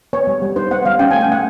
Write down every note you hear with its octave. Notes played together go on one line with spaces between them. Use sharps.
B3 C#5
G3
G3
D#4 C5
B3 F#5
G3 F5
C#4 G5
G#5
A3
G5
A3 F#5